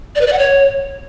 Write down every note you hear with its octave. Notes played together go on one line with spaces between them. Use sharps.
D5
B4
D5
F#5
C#5